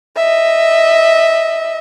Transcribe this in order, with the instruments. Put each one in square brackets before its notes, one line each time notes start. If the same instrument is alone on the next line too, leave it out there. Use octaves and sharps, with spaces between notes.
[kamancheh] D#5 E5